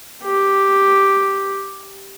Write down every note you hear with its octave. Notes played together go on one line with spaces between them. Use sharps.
G4